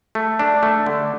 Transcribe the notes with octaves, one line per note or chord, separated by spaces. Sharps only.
A3
D4
A3
D3